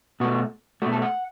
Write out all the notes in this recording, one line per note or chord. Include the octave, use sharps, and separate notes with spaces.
B2 A3 F#4
B2 A3 F#4
A4
F#5